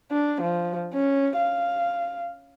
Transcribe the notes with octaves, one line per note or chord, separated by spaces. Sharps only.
D4
F3
C#4
F5